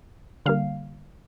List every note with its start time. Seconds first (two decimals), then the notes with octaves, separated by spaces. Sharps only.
0.46 D3 G3 A#3 F5